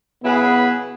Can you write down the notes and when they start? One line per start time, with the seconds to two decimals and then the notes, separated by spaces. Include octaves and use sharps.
0.22 C#3 F#3 B3 E4 G#4 B4